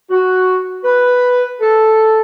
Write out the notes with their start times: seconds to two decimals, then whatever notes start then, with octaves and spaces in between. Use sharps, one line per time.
0.11 F#4
0.84 B4
1.60 A4